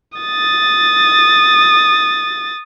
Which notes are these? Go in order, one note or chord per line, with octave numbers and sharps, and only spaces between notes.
D#6 A6